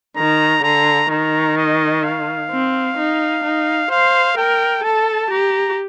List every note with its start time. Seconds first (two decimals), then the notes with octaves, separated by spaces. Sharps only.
0.17 D#3 A#5
0.64 D3 A#5
1.10 D#3 A#5
1.57 D#5
2.04 F5
2.51 C4
2.97 D#4
3.44 D#4
3.91 C5 F5
4.37 A#4 G5
4.84 A4 A5
5.31 G4 A#5